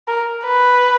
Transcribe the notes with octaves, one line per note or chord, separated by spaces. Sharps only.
A#4
B4